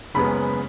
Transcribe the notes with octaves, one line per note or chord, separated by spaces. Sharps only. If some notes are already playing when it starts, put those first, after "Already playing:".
F#1 F#2 C#3 G#3 B3 B5